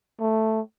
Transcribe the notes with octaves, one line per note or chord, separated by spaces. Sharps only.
A3